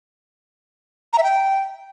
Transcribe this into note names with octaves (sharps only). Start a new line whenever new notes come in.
A#5
E5
G5